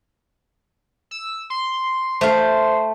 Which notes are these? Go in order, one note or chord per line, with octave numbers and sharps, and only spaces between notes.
E6
C6
A3 C5 F5